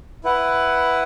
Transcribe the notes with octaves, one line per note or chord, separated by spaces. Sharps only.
E4 B4 F#5